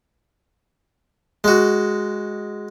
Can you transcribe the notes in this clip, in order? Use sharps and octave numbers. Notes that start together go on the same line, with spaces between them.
G#3 F#4